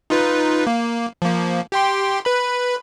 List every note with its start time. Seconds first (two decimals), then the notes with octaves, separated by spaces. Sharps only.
0.10 D#4 F4 B4
0.67 A#3
1.22 F3 A#3
1.72 G4 G5 C6
2.25 B4 B5